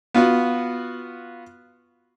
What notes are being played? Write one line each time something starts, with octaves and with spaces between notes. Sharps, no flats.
B3 F4 F#4